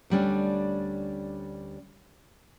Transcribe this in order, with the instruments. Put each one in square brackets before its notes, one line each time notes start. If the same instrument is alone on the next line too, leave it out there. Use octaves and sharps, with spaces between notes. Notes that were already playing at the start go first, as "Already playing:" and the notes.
[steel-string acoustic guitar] D2 G3 C#4 D4